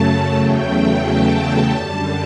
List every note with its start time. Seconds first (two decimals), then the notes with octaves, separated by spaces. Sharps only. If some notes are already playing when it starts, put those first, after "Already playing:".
Already playing: F#2 C#3 F#3 A3 A5
0.38 E2 C#3 F#3 A3 G5
1.03 A5
1.69 F#2 D3 G3